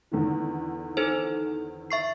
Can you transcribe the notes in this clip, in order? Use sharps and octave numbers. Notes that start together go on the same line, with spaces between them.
E2 D3 D#3
D#4 A4 C5
E5 C#6 C7